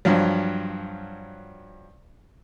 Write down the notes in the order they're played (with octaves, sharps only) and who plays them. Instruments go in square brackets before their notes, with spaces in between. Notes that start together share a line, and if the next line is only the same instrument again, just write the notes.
[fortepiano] G2 F3 F#3